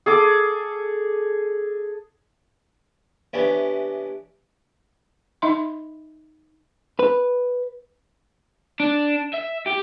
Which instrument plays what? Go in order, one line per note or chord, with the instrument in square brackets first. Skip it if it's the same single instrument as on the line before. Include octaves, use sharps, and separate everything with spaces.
[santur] G#4 A4 D6
[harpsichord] C3 E3 B3 C#4 D4 G4
[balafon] D#4 D#5 E5 B5 C6
[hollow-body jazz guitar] B4
[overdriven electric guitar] D4
E5
G4